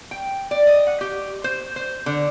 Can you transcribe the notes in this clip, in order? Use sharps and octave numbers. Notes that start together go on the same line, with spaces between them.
G5
D5
D#5
F#5
G4
C5
C5
D3